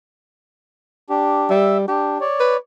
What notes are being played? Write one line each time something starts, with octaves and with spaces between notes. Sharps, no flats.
D4 G4
G3 E5 E6
D4 G4
C#5 D5
B4